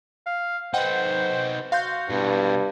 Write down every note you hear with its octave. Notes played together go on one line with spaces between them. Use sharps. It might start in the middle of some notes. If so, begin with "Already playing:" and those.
F5
D#4 B4 C5 F#5 G5
F#4 F5 C6 G6
G2 B2 E4